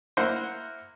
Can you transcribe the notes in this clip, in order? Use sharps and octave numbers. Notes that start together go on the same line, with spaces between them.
A#3 E4 C5 F#5